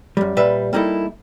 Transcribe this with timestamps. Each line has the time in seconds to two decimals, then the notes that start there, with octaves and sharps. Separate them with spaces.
0.17 F#2 G3
0.37 A#2 G3 B4 E5
0.73 G3 A#3 D#4 E4 A4